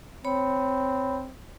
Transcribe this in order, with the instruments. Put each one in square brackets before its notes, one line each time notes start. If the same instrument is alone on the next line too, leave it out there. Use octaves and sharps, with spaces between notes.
[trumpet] C4 [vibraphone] C#5 B5